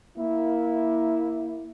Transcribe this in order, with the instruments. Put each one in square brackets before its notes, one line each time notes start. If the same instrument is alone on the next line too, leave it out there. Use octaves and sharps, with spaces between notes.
[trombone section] A#3 E4